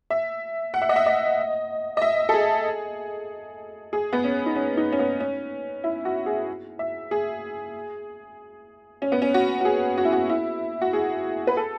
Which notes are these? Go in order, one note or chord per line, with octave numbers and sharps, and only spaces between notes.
E5
F#5
E5
D#5
E5
D#5
D#5
E5
A4
G#4
G#4
B3
C#4
D#4
C#4
D#4
C#4
B3
C#4
E4
F#4
G#4
E5
G#4
C#4
B3
C#4
F#4
F#4
G#4
F#4
E4
F#4
E4
F#4
G#4
B4
A4